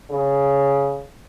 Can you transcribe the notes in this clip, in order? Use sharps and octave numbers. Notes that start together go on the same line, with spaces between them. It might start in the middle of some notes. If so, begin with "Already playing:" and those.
C#3